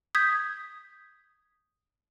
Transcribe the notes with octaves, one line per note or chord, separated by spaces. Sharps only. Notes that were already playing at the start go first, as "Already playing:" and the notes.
D#6 G6 G#6 B6